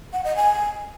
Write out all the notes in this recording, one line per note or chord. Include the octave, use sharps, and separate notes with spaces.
F#5
D#5
G#5